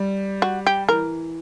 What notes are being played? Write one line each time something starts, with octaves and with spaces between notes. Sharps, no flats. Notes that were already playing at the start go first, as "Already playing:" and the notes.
Already playing: G3
F#4
G4
E3 A#4